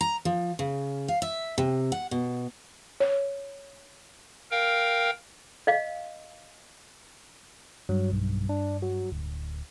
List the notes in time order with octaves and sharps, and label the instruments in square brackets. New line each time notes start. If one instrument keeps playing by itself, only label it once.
[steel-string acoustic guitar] A#5
F3
C#3
F5
E5
C3
F#5
B2
[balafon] C#5
[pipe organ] A#4 F5 G5
[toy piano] D#5 F5
[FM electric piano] G2 [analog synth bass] F#3
[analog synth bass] B1
D4
F#3
D1